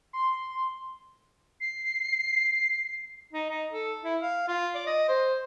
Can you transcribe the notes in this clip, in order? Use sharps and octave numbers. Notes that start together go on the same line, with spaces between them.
C6
C7
D#4
D#4
A4
E4
F5
F4
D5
D#5
C5